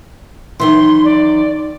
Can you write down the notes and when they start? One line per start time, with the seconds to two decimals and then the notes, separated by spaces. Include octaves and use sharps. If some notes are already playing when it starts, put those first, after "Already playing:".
0.60 F#2 D#3 E3 C6
1.05 D5